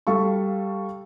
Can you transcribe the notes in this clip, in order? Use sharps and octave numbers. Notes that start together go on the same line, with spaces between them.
G3 A4 F5 C#6